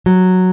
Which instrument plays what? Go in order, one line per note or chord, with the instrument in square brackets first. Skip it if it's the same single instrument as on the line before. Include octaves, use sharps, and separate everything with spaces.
[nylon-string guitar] F#3